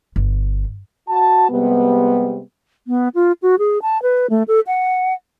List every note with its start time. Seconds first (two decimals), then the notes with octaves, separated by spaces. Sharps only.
0.16 G1
1.09 F#4 A5
1.49 C3 G3 G#3 B3
2.88 B3
3.15 F4
3.42 F#4
3.59 G#4
3.82 A5
4.03 B4
4.30 A3
4.48 A4
4.67 F#5